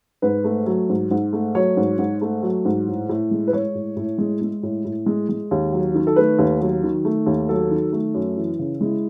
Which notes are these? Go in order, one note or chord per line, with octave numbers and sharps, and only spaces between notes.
G#2 B4
A3
F#3
G#2
G#2
A3
F#3 C#5
G#2
G#2
A3
F#3
G#2
A2
A2
G#3
B4
G#3 C#5
A2
A2
G#3
G#3
A2
A2
G#3
G#3
D#2
F#3
D#3
A4
A3 B4
D#2
F#3
D#3
A3
D#2
F#3 A4
D#3
A3
F#2
E3
C#3
G#3 E4